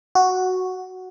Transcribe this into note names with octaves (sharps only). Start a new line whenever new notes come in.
F#4